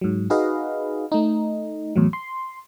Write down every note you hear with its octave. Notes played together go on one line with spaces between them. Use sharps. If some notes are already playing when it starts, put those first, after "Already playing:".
G#2 F#3
D#4 F#4 G#4 B4 D#5 F5
A3 D#4
E2 A2 F#3
C6